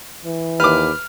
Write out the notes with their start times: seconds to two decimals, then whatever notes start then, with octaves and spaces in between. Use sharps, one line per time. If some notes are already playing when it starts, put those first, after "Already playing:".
0.25 E3
0.60 D#2 B4 D6 F6